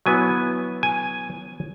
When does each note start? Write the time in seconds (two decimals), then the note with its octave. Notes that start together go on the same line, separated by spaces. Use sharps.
0.06 F#3 B3 E4 G#5
0.83 G#5